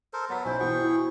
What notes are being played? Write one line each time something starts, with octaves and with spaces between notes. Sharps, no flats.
A4 A#4 C5
F#3 B3 A6 B6
B1 C#4 E4 C5
B2 E3 F4 G#4 G5 C#6
E4 F#4